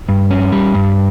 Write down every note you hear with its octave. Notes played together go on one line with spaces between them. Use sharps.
G2
C#4
G3
G2